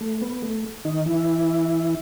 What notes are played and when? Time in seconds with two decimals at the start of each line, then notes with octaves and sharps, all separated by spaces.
0.01 A3
0.21 B3
0.42 A3
0.85 D#3 D#4
1.06 E3 E4